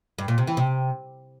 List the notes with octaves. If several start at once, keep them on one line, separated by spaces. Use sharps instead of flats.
G2
A#2
C3
E3
C3